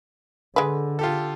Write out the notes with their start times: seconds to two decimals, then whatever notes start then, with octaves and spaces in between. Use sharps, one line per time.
0.56 D3 G#3 B4
0.99 F4 G4 A4